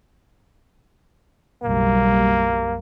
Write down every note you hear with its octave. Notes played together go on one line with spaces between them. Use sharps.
F#1 B1 G3 A#3